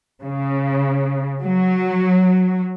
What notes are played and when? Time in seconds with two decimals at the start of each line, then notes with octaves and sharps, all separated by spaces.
0.22 C#3
1.43 F#3